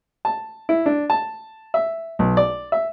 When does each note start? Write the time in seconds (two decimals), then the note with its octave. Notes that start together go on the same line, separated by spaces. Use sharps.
0.25 A5
0.69 E4
0.86 D4
1.10 A5
1.74 E5
2.19 B1
2.37 D5
2.72 E5